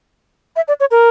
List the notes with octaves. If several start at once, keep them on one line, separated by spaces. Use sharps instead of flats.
E5
D5
C#5
A#4